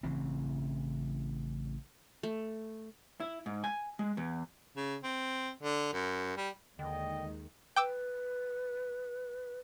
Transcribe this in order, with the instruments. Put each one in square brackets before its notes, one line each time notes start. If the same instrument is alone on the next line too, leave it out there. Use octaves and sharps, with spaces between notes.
[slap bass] A1 C#3 E3 C4
[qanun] A3
[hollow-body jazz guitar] E4
G#2
G#5
G#3
E2
[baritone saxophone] C#3
C4
D3
F#2
G3
[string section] D#2 D#3 G#3 [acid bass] D3 [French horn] D#5 [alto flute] G5
[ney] B4 [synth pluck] G5 D6 E6